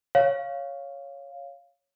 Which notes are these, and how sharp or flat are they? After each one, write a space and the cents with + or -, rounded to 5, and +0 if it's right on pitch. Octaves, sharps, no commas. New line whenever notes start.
C#5 +0 F5 +0